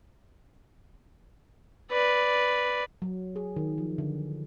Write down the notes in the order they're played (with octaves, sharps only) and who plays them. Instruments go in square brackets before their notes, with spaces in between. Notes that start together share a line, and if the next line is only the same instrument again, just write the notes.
[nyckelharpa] B4 D5
[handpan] F#3
G#4
D#3
F3
D3